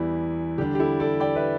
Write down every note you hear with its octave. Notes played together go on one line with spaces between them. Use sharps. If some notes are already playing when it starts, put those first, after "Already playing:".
Already playing: E2 E3 G3 E4
D3 G3 D4 G4
G4
E4 A4
A4 D5
D5 G5
B4 E5